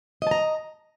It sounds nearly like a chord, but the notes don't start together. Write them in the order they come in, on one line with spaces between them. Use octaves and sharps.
D#5 A5 A#5